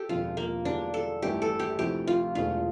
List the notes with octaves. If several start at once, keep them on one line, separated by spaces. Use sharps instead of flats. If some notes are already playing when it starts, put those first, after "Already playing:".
Already playing: G4 A4
E1 E2 D3 F3 C4 F4
A#3
E2 D3 G3 D4
A4
G1 G2 E3 A3 E4 G4
A4
G4
D2 C3 F3 C4 E4 G4
F4
E1 E2 D3 A3 F4